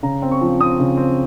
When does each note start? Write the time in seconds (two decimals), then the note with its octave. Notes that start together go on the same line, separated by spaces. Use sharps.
0.03 C#3 A#5
0.22 C4
0.32 C#6
0.41 F3
0.60 C4 D#6
0.79 C#3
0.97 C4